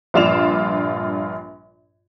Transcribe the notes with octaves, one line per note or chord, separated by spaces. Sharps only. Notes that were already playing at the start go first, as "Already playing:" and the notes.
A#1 G2 F4 D5 E7 F7